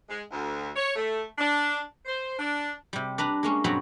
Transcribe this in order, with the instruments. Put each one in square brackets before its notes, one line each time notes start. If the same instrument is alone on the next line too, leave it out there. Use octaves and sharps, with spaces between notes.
[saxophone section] G#3
D2
C#5
A3
D4
C5
D4
[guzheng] C3 G3
D4 B4 A#5
G#3 A#3 C#4
G2 B2 F#3 C4 A#5 B5